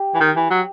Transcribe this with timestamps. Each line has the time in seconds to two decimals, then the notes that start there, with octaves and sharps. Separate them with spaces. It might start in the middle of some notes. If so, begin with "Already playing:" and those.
Already playing: G4
0.15 E3
0.21 D#3
0.36 E3
0.51 F#3